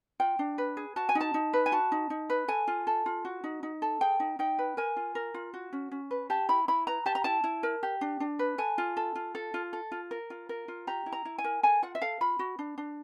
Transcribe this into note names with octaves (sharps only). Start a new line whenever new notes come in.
F4 G5
D4
B4
G#4
F#4 A5
G#5
D#4
A5
D#4
B4
G#5
F#4 A5
D#4
D#4
B4
A4 G#5
F4
A4
F4
F#4
D#4
D#4
A4
G#4 G5
D#4
D#4 G5
B4
A#4 G#5
F4
A#4
F4
F#4
C#4
C#4
B4
G4 A5
E4 B5
E4 B5
B4 A#5
G4 A5
A#5
E4 A5
E4
A#4
G4
D4
D4
B4
A4 G#5
F4
A4
F4
A4
F4
A4
F4
A#4
F4
A#4
F4
G4 A#5
E4
A#5
E4
G#5
A#4
A4 G#5
F4 F#5
E5
A4 F5
F4 B5
F#4
D4
D4